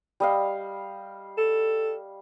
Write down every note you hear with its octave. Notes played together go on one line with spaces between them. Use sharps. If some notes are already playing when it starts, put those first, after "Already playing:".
G3 D#5 F5
A4